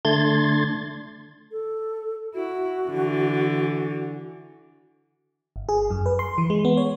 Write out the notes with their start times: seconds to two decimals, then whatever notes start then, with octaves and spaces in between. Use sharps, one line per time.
0.05 D3 A3 D4 C6 G#6 A6
1.51 A4
2.34 E4 F#4
2.90 D3 E3
5.56 G1
5.69 G#4
5.91 F#2
6.06 B4
6.19 C6
6.38 E3
6.50 G#3
6.65 B3
6.77 C#5